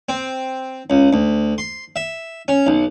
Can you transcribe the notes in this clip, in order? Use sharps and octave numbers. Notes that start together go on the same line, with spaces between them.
C4
C#2
D2
C6
E5
C#4
B1